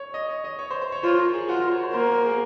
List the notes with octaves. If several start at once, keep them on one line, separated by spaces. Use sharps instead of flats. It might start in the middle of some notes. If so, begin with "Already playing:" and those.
Already playing: C#5
D#5
C#5
D#5
C#5
C5
C5
C#5
F4 C5
A#4
G#4
F4 F#4
A#4
C5
C#5
C5
A#3 C5
A#4
G#4